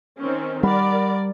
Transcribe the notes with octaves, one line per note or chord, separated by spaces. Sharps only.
D#3 C4 C#4
G3 A#4 D5 F#5 B5